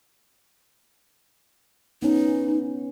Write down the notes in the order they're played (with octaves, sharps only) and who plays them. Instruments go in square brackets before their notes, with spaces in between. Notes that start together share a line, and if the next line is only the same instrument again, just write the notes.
[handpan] B3 C#4 [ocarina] D#4